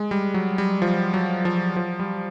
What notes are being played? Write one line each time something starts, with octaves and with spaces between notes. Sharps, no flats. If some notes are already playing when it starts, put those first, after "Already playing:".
Already playing: G#3
G3
F#3
G3
F3
F#3
F3
F3
G3